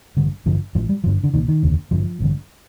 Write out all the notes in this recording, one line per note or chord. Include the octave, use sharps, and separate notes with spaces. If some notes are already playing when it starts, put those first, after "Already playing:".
A1 G2 D3
A1 G2 D3 F3
A1 A2 F3
G3
G1 G2 D3 F3
D3
C2 A#2 D#3
D#3
F1 D#2 D3
A1 G2 D3 F3
A1 G2 D3